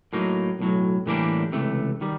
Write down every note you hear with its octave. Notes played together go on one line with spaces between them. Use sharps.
A2 F#3 A#3 D#4
B1 A2 F#3
A2 E3 G3 A#3 D4
C#2 C3 E3 A3
D#3 G3